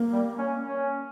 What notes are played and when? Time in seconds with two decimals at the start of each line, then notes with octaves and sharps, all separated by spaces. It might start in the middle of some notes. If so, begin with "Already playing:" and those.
Already playing: A#3
0.13 G3
0.38 C#4
0.64 C#4